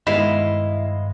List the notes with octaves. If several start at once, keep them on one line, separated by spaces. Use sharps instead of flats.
G2 D#3 G#3 B3 E4 D#5 F5